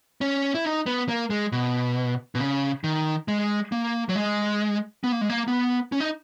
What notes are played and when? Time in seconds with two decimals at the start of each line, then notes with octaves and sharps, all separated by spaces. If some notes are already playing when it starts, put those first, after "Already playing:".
0.21 C#4
0.54 E4
0.64 D#4
0.86 B3
1.08 A#3
1.30 G#3
1.52 B2
2.35 B2
2.40 C#3
2.84 D#3
3.28 G#3
3.72 A#3
4.09 F#3
4.16 G#3
5.04 B3
5.12 A#3
5.21 G#3
5.30 A#3
5.48 B3
5.92 C#4
6.01 D#4